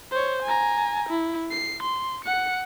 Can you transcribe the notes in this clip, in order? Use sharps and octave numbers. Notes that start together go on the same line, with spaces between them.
C5 C#5
G#5 A#5
E4
C7
C6
F#5 C#7